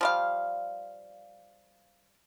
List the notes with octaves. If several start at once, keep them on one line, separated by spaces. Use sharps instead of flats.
F3 G3 F5